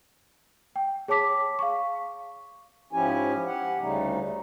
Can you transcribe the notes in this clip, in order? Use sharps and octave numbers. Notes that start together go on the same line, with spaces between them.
G5
G#4 C#5 A5 D6 B6
F5 C#6
G#2 F3 C#4 E4 G4 G#5
G4 F#5
D2 C#3 G3 A3 D#4